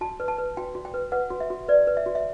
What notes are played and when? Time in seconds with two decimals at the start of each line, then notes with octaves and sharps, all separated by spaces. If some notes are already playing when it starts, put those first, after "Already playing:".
0.01 F#4 A5
0.20 B4
0.28 A5
0.38 B4
0.57 F#4 G5
0.75 F#4
0.85 G5
0.94 B4
1.12 B4 F#5
1.30 F#4
1.40 E5
1.50 F#4
1.68 B4 D5
1.87 B4
1.97 E5
2.06 F#4
2.15 E5